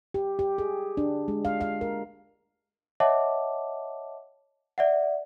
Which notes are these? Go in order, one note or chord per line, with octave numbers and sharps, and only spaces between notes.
G4
G4
G#4
D4
G#3
F5
F5
A#4
C#5 D#5 E5 F#5 A5 D6
D5 E5 F#5